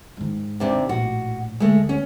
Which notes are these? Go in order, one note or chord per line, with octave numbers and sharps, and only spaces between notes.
G#2 D#3
D#2 C3 D4
A#1 A2 F#4
D2 G#3 A3
C#4